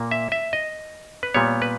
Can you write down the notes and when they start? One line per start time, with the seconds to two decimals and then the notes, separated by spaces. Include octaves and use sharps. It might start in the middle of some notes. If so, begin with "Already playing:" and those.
Already playing: A#2 A#3
0.11 E5
0.32 E5
0.53 D#5
1.23 B4
1.34 A#2 G3 B3 C#5
1.62 B4